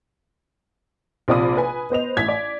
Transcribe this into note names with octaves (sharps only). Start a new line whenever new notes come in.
A#1 C3 F4 D5 B5 D#6
B4 G#5
B3 C5 D#5 F7
A1 G#6 B6
D5